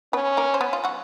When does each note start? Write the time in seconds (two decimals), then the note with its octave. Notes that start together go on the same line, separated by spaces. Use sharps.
0.13 B3 C#4 B4
0.37 A#3 A#4
0.54 C5
0.61 B3 B4
0.73 F4
0.84 F#3 F#4